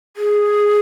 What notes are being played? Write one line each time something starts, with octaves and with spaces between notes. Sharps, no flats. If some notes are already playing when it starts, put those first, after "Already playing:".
G#4